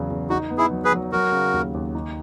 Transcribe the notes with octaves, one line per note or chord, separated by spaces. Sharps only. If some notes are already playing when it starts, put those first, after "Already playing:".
Already playing: E2 C#3 F#3
E2
D#4 F#4
B3
E4 G#4
F#3
G#4 B4
F#3
F#3 F#4 A#4
C#3
D#2
D#2
D#4